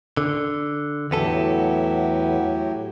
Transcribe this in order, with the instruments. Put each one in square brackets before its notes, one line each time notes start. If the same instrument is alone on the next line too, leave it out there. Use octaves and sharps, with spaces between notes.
[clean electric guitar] D3
[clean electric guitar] E2 B3 A4 [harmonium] A2 F#3 G4